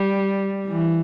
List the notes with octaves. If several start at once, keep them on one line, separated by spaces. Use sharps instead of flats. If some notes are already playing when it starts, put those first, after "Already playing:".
Already playing: G3
E3